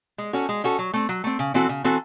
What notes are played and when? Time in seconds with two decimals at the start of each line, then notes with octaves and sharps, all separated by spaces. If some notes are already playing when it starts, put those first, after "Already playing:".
0.18 G#3
0.33 C#4 F#4 A4
0.49 G#3
0.64 C#4 F#4 A4
0.79 F#3
0.93 A3 C4
1.09 F#3
1.24 A3 C4
1.39 C#3
1.54 E3 C4 F#4 A4
1.69 C#3
1.84 E3 C4 F#4 A4